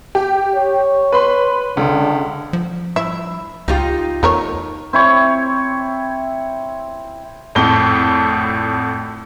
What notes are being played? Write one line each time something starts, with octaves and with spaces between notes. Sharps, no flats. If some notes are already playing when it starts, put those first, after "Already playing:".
G4
C#5
B4 B5 C6
C#2 D3
F3
E4 E5
C#2 D#4 F4 G4
E2 A3 A#4 C#5
C4 E4 C#5
G#1 F2 A2 G7